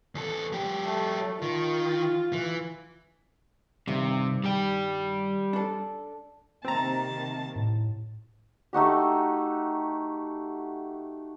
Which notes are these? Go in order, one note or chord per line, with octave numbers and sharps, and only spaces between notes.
E2 A4
F#3 G4
A3
D#3 F4
E3
G2 C3 D#3
G3 G4
D4 A4
C3 D#3 A#3 C4 A5 A#5
A2
A3 D#4 F#4 G4